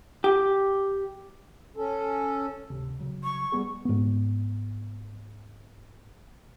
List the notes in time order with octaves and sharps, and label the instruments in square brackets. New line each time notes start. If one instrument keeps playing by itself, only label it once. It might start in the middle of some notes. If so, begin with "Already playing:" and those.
[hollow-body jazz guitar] G4
[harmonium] C#4 A4
[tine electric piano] G#1 D2 C3
C#3 F#3
[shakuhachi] C#6
[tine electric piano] G3 B3 G#4
[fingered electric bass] G#2 B3